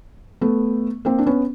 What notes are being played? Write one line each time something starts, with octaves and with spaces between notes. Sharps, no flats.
A3 B3
A#3 C4
D4
B3 C#4